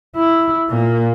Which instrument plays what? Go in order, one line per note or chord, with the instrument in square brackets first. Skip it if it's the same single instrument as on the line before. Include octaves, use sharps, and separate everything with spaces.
[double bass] E4
A#2 A#3